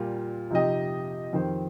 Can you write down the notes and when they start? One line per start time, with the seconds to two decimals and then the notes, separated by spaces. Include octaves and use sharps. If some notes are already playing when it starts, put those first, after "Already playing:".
Already playing: A#2 G3 A#3 F4
0.50 C3 F3 D#4 G4 D#5
1.33 F2 D#3 C4 G4 C5